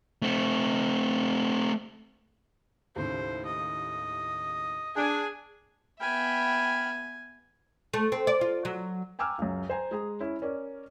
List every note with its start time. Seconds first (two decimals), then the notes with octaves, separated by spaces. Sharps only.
0.22 A3 C4
2.96 D#2 A2 C#3 C5
3.45 D#5
4.96 D4 G#4 G#5 F#6
6.01 B3 E5 G5 G#5 B5 F6
7.94 A3
8.12 C4
8.27 D5
8.41 F4
8.65 F#3
9.19 G5 G#5 A#5 D6 E6 F6
9.38 C#2 F#2
9.69 C5 G#5 A#5
9.91 G#3 G#4 A#5
10.20 C#4 E4
10.42 C#4 A#4 D5